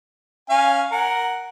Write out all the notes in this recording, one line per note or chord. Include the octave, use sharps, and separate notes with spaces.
C#4 F5 G#5
A#4 F#5